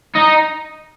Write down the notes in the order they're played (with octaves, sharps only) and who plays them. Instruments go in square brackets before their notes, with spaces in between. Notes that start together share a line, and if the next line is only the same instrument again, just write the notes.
[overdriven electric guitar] D#4